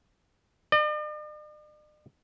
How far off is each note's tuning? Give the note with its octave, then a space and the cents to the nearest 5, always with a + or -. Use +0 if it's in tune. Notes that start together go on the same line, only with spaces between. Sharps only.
D5 +45